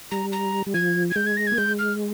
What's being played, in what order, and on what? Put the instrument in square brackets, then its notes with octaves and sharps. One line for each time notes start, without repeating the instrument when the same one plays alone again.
[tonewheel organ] G3 [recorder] A#5
[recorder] A#5
[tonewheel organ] G3
[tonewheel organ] F3 [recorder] G#6
[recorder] G#6
[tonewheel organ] G#3 [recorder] G6
[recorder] G#6
A#6
G#6
[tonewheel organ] A#3
[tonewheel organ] G#3 [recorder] G6
[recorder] F6